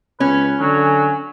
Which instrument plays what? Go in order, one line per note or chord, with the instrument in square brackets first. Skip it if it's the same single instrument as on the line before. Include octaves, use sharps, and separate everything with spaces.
[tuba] C#2 [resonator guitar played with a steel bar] C#4 [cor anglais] B4
[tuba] D3 [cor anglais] F#3 [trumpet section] G#5